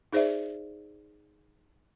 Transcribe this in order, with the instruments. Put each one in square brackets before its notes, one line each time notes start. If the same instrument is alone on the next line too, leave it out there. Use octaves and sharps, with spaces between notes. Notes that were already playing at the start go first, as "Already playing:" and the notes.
[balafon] D#4 G#4 C5 D5 E5